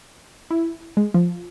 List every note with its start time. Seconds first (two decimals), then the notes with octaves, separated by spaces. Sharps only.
0.51 E4
0.97 G#3
1.14 F3